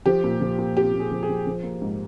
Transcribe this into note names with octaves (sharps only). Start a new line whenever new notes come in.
F3 G4
A#2
F3
A#2
C4 G4
A#2
G#4
F3
G#4
F3
F3
A#3
G#2